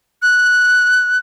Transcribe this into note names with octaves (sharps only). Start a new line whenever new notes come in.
F#6